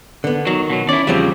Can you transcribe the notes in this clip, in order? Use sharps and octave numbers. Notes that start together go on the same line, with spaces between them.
D3 B3
D#3 F#3
B2 F#3
C#4 E4 D5
E2 C#3 F3 G3 C4